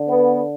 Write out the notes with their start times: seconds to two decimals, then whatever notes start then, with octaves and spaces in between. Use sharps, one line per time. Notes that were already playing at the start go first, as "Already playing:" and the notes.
Already playing: D3
0.08 B3